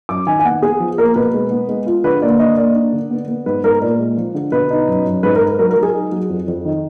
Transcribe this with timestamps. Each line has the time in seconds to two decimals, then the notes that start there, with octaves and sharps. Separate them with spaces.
0.09 F#2 D6
0.27 D#3 G#5
0.40 G#5
0.45 B3 F#5
0.62 B3 G#4
0.80 F3
0.98 A#3 A#4
1.16 B2 B4
1.34 G#3
1.51 B3
1.69 G#3
1.87 F4
2.04 D3 B4
2.22 A#3 D5
2.39 D4 D#5
2.57 A#3 D5
2.75 D4
2.93 D3
3.11 B3
3.28 B3
3.46 G#2 B4
3.63 G#2 A#4
3.81 A#2 D5
3.99 G#3
4.17 F3
4.35 D3
4.52 B2 B4
4.70 D#4
4.88 F#2
5.06 F#2
5.23 G#2 B4
5.35 A#4
5.41 G#2
5.59 F#3 A#4
5.71 A#4
5.76 F#3
5.83 G#4
5.94 D#4
6.12 F#3
6.30 F2
6.48 F2
6.65 D#3